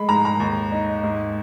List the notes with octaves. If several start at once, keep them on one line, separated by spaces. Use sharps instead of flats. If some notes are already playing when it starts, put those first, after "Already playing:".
Already playing: G#3 B5
G#2 A#5
A#5
D#2
D#4
G#2